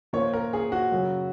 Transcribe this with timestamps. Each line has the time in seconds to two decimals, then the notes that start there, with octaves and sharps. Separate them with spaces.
0.13 A#2 F3 A#3 C#5
0.34 A#4
0.53 G#4
0.72 F#4
0.92 F#2 C#3 F#3